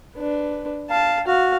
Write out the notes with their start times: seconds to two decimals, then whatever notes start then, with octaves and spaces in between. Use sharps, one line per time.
0.16 D4 B4
0.90 F5 A5
1.27 F#4 F5